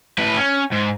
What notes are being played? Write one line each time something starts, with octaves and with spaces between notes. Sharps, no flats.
A2 B4
C#4
G#2